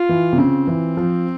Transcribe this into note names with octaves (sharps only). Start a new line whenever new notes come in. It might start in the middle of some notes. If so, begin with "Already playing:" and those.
Already playing: F4
E3
C3
C#3 C4
E3
F3